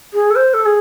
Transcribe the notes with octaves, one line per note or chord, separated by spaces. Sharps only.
G#4
A4
C5
A4
G#4